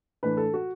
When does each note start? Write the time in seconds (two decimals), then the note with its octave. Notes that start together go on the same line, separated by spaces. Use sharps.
0.23 A2 E3 A3 D4 B4
0.37 A4
0.54 F#4